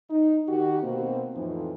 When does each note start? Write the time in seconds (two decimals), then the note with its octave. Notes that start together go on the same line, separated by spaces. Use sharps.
0.10 D#4
0.48 D#3 F#4 G4
0.83 B2 A#3 C4
1.35 F2 A2 E3 F3 C4 D#4